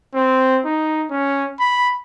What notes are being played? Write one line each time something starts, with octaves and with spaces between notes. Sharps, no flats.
C4
D#4
C#4
B5